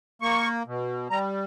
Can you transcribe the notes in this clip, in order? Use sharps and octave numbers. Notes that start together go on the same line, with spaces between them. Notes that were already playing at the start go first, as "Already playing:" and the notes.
A#3 C#6
B2
G3 A#5